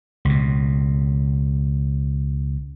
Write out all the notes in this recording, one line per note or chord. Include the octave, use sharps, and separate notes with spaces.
C#2 B2